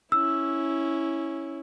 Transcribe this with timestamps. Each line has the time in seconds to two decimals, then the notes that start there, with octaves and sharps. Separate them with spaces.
0.12 C#4 E4 E6